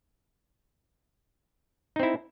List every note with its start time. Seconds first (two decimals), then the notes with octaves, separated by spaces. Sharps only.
1.96 D#4
2.00 C4
2.03 E4